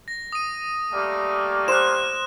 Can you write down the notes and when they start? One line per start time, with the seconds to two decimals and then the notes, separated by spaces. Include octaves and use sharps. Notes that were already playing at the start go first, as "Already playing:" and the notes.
0.08 A#6
0.32 D#6 D#7
0.92 G3 A3 A#3
1.68 C5 F#6 E7